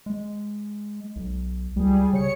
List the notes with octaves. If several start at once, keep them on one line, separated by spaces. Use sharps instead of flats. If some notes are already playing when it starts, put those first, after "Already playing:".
G#3
B1
C#2 G3 G#4
C#3 C#5 C#7